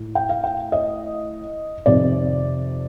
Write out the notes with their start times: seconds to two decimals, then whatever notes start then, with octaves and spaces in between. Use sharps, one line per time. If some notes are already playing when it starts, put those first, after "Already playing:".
Already playing: A2
0.15 G5
0.29 F5
0.44 G5
0.72 D#5
1.86 F2 C3 D#3 D5